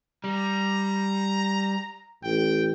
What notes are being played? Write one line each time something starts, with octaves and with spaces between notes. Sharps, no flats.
G3 A#5
A1 G5